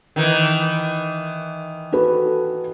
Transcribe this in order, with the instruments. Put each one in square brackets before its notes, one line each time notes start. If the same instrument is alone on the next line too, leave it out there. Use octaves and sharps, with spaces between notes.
[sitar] D#3 E3
[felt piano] F#4 A4 B4